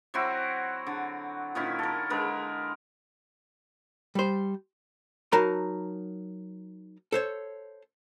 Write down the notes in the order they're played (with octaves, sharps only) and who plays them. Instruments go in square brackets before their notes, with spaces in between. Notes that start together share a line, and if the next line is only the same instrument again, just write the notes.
[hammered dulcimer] F#3 C4 E4 F#4
D3
A#2 D#3 C#4 E4
A4 A#4
D3 G#3 A#4 B4
[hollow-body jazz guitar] G3 C5
F#3 D#4 A#4 A5 B5
A4 C5 C#5